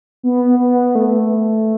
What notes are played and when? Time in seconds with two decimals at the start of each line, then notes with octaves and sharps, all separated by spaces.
0.23 B3
0.59 B3
0.95 A3